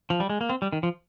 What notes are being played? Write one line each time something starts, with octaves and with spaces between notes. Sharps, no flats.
F3
G3
G#3
A#3
C4
G3
D#3
F3